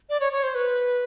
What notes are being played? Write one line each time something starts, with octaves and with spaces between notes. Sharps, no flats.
D5
C#5
C#5
C5
B4